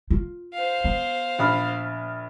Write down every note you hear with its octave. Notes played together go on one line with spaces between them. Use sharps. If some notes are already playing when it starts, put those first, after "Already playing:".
F4
C5 F5
B3
A#1 B5 F6